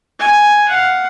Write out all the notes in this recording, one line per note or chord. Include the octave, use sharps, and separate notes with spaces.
G#5
F5 F#5